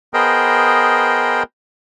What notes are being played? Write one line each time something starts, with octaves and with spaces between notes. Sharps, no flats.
B3 G#4 A#4 C5 D#5 G5